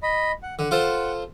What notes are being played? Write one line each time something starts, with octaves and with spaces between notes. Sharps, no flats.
D#5 B5
F#5
D3 F#5
F4 A4 C5